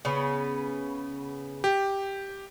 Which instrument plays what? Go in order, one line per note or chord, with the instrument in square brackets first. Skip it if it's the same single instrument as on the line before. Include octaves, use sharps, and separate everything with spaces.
[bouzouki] C#3 B3
[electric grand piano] G4